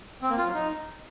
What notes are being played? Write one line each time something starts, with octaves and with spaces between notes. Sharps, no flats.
C4
A#3
F4
F#3
D#4